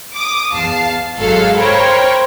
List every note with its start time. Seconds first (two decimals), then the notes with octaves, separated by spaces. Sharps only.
0.15 D6 D#6
0.52 E2 F5 A5 C7
1.18 G#1 F#3 G#3 A4 F5
1.59 A#4 C5 C#5 G5 B5